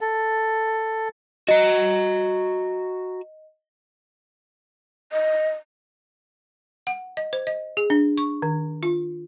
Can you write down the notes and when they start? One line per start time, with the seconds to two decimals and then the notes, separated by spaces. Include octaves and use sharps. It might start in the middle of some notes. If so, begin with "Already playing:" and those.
0.01 A4
1.48 F#4 D#5 A#5
5.12 D#5
6.87 F#5
7.17 D#5
7.33 C5
7.47 D#5
7.77 G#4
7.90 D4
8.18 C#6
8.42 D#3
8.83 F4